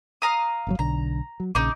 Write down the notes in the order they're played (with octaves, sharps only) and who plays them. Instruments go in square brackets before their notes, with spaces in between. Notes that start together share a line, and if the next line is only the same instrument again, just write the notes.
[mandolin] F5 A#5 D#6
[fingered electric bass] G1 C3 F#3
[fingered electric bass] B1 D3 [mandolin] A#5
[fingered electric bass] F#3
[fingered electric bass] A#1 C#3 [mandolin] D#4 D6